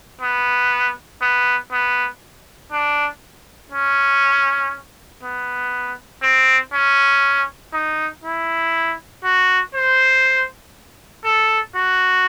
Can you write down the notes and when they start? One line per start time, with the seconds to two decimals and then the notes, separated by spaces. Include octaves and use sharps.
0.21 B3
1.21 B3
1.71 B3
2.72 D4
3.72 C#4
5.23 B3
6.23 C4
6.73 C#4
7.73 D#4
8.24 E4
9.24 F#4
9.75 C5
11.25 A4
11.75 F#4